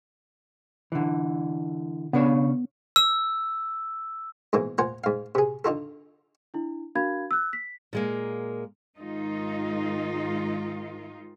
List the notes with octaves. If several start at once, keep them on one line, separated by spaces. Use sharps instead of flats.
D3 E3
C#3 B3 D4 C#5
E6
G#2 B2 E3 A#3
A#3 F4 C5 F#5 G#5
G#2 F5
C3 G#4
D3 D#4 F4 A4
D4 E4
D4 F#4 A#4 F5 B5 G#6
E6 F#6
B6
A#2 G#3 A#3
G#2 D#3 G#3 D#4 F4